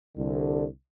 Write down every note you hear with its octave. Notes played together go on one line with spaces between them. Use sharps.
C2 D3